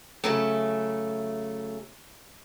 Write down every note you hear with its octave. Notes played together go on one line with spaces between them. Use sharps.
C#3 F#3 A3